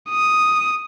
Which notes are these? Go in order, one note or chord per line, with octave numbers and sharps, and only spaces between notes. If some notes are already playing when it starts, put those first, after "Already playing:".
D#6